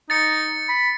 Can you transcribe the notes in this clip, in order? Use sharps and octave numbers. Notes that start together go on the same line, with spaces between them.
D#4 A6 C#7
B5